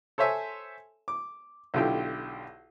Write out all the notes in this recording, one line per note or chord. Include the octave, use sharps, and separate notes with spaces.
A4 C5 C#5 E5 G#5
D6
B1 D3 E4 F4 G4 G5